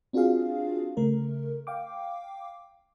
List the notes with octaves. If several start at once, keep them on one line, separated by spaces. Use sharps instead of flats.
C4 D4 F4 F#4 G#4 F5
C#3 A3 A#4
F5 G5 D6